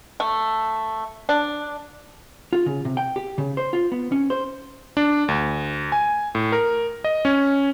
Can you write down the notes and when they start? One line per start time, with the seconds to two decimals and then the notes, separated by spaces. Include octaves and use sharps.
0.20 A3
1.29 D4
2.53 F4
2.66 C#3
2.85 C3
2.97 G5
3.16 G4
3.38 C#3
3.57 C5
3.73 F4
3.92 B3
4.12 C#4
4.30 C5
4.97 D4
5.28 D2
5.92 G#5
6.35 A2
6.52 A#4
7.04 D#5
7.25 C#4